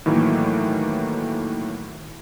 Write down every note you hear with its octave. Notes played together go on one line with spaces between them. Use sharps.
A2 D#3 E3 F#3 A3 A#3